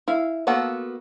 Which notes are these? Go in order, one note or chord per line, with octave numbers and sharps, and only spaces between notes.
E4 F5
A#3 B3 F4 F#4 A4